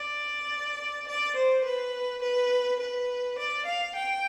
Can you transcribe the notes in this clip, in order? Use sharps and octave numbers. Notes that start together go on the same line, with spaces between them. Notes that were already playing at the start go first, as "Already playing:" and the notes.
Already playing: D5
D5
C5
B4
B4
B4
D5
F5
G5